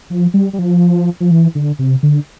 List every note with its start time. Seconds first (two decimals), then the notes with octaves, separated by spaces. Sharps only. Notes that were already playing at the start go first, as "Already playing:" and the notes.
0.10 F3
0.34 G3
0.53 G3
0.59 F3
1.20 F3
1.31 E3
1.55 D3
1.79 C3
2.03 D3